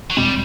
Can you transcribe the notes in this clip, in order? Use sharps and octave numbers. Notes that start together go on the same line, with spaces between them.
F#3
E2 B2 G3 G#3 C4